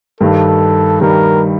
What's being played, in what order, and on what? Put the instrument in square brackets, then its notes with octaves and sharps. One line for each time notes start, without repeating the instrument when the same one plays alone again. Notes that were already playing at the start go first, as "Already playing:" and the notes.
[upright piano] G2 D#3 G3 [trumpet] A4
[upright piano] G2 D#3 G3 [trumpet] A#4